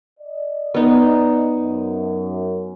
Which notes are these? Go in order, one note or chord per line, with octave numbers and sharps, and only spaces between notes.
D5 D#5
B3 D#4
F#2